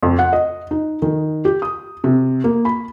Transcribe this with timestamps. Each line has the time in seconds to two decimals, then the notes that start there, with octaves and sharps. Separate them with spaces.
0.03 F2
0.19 F#5
0.33 D#5
0.71 D#4
1.02 D#3
1.45 G4
1.62 D#6
2.04 C3
2.44 A#3
2.65 B5